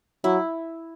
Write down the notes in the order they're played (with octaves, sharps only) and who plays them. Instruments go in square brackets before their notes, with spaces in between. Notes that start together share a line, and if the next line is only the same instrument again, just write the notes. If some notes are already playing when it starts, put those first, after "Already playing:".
[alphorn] F#3 [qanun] E4